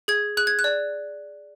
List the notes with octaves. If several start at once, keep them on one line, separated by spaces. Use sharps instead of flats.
G#4 G#6
G#4 F#6
G#6
F#6
D5